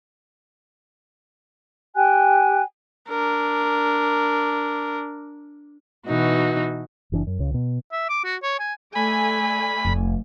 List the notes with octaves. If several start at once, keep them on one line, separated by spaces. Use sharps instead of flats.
G4 G5 G#5 F#6
D4 A#4
B2 E3 D#4 F#4
F#1 E3 D4
F#2
C#2 C#3
B2
E5
D6
F#4
C#5
G#5
A3 D5 G#5 B5
F1 D#4